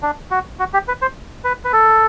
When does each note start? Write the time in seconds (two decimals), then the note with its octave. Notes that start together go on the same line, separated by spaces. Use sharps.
0.03 D4
0.31 F#4
0.59 F#4
0.73 G4
0.88 B4
1.02 C5
1.44 B4
1.65 B4
1.73 A4